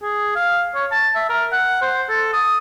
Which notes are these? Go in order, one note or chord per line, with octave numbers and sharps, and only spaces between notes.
G#4
F5
C#5
A5
E5
A#4
F#5
C5
A4
D#6